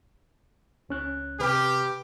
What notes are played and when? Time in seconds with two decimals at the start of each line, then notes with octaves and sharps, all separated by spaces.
0.89 C#2 C#4 F#6
1.40 C3 G4 B4 F6